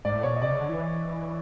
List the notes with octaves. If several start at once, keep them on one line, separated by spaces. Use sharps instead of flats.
G#2 D5
A2
B2 C#5
A#2 D#5
C3 D5
C#3
D3
E3